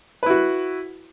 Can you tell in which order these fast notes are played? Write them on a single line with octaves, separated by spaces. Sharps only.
B4 E4 F#4